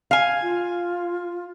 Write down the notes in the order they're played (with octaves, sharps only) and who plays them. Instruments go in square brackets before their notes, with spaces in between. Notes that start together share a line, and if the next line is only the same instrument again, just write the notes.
[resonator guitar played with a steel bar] F5 G#5
[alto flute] F4